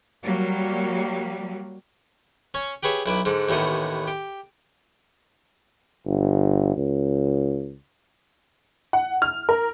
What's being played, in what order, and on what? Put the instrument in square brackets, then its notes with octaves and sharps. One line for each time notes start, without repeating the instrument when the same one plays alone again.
[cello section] F#3 G3 A#3
[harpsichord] C#4 C#5
G4 G#4 B4 C#5 E5
B1 E4 B4 D6
G#2 D3
A1 D#2 A2 B3 D#6
G4
[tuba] G1
C#2
[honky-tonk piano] F#5
F6
A#4